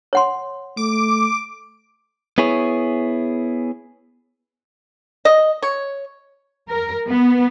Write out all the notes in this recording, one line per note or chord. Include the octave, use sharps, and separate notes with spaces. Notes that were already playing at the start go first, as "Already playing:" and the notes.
C#5 F#5 C6
A3 D6
B3 E4 G#4 C#5
D#5
C#5
A#4
B3